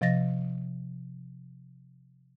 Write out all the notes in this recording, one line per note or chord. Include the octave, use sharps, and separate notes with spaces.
C3 F3 D#5 A6 A#6